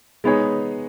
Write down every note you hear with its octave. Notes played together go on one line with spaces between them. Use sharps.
G#3 B3 D#4 G#4 C#5